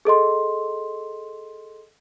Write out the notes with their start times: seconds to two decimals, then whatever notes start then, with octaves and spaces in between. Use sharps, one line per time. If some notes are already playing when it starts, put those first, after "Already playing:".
0.05 G#4 A4 D#5 C6